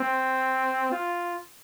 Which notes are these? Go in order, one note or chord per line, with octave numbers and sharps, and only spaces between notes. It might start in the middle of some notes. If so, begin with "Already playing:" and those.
Already playing: C4
F4